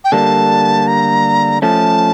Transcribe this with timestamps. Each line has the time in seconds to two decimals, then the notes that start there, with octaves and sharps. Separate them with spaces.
0.04 G5
0.12 D3 G3 A#3 A5
0.87 A#5
1.62 F3 A3 C#4 A5